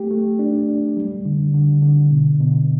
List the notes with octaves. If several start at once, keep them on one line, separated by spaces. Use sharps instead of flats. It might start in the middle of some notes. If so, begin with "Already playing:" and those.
Already playing: A3 G4
A3
D4
D4
G3
D3
D3
D3
B2
B2